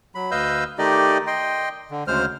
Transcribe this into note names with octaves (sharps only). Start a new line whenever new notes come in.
F#3 B5
D2 B4 D#5 F5 E6 G6
D#3 A3 D#4 G4 D5 D#5
D#5 G5 C6
D3
D2 C#3 G#3 C5 F6